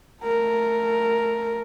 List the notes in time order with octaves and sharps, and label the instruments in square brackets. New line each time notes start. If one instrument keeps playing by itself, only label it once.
[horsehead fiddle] A3 A#4